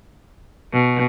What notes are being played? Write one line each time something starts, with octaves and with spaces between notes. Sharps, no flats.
B2